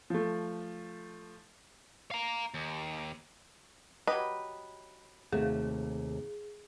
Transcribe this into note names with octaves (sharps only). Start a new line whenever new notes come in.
F3 A3
F5 A#5
D#2
F#3 G4 B4 D#5
D#2 C3 F#3 A3 G#4